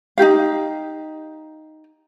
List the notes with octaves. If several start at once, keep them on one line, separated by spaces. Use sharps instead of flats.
D#4 F4 G4 F5